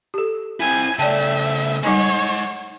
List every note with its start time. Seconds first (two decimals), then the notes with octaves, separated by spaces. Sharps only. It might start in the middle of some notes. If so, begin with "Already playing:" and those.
0.14 G4 A4
0.60 C4 E4 G#5
0.99 C#3 A3 D5 E5 G5 A5
1.83 G3 G#3 D#4 C#5 F#5 G#5